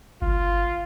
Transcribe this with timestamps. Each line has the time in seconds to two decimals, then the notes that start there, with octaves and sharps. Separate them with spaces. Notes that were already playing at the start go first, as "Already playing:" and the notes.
0.22 G1 F4